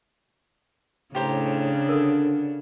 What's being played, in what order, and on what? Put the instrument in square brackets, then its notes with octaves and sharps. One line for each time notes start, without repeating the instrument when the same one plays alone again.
[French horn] A2 [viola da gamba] C#3 D4 [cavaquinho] G4 C5 A#5
[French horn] D3 [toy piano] A4 A#4